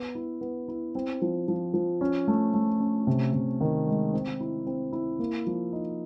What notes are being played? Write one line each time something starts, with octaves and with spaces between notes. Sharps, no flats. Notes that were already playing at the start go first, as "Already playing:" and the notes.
Already playing: B3
E4
B3
E4
C4
F3
F3
F3
C#4
A3
A3
C#4
C3
C3
D#3
G#3
C4
E4
C4
E4
A#3
F3
D#4